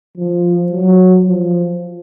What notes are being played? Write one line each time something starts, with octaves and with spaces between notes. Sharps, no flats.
F3
F#3
F3